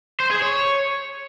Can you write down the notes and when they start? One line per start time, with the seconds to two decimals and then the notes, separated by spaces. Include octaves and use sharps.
0.20 C5
0.31 G#4
0.42 C#5